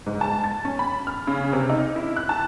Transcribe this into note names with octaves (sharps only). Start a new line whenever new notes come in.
G#2
A5
A6
C#4
B5
F6
C#3
C3
D#4
E4
F#6
A5